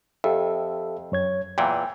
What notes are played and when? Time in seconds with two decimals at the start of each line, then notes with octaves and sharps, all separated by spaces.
0.24 F2 G4 A4 E5
1.12 F#2 C#5 G#6
1.58 E2 A#2 E3 G5